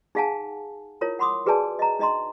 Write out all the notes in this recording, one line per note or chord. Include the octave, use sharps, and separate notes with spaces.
D#4 G#4 F5 F#5 G#5 A5
E4 F4 A#4 C#5
F#5 B5 C6 D6 D#6
F#4 G#4 B4 D5 G#5 A5
D#5 A#5
D4 D#4 D#5 A#5 C6